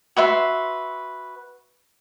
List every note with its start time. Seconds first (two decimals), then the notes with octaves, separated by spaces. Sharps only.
0.17 F#4 B4 E5 C6